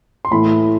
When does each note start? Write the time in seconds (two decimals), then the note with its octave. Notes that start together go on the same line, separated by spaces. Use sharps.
0.25 C6
0.31 A2 E3 A3 B5